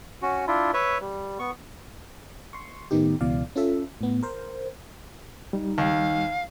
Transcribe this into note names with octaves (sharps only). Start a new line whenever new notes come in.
C#4 F#4
D4 E4 F4
B4 C#5 E5
G3
B3 C#6
C6 C#6
A2 D#3 B3 D#4 G4
C#2 B2 E3 D5 F5
C#4 F4 A4 E5
A2 B3
A#4 C5
G3 D#4
D#2 F5